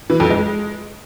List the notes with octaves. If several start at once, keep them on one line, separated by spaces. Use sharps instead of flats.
E3
F2
G#3